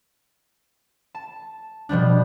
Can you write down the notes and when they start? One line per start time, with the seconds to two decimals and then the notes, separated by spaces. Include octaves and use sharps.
1.15 A5
1.89 B2 F3 G3 D4